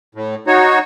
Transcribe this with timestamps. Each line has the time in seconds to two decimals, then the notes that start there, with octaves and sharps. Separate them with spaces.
0.15 A2
0.47 D#4 F#4 C#5